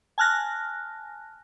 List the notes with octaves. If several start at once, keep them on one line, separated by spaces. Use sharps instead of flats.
G#5 A5 F6 F#6 A#6